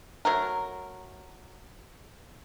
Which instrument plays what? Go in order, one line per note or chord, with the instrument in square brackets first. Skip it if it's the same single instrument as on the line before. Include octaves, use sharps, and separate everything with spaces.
[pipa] F#3 A3 A#4